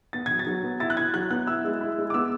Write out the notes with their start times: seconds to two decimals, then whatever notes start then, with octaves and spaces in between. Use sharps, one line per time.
0.13 B3 A6
0.26 F#3 G#6
0.39 A6
0.47 F#3
0.64 B3
0.80 E4 A6
0.90 F#6
0.97 E4 G#6
1.14 F#3 F#6
1.31 B3 F#6
1.47 E4 E6
1.64 G#3
1.81 E4
1.98 G#3
2.10 D6
2.14 B3 E6